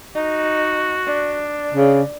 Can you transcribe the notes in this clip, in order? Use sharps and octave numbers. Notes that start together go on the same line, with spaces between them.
D#4 F#4
D4
C#3